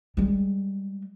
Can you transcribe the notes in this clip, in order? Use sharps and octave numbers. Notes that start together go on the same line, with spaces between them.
G3 G#3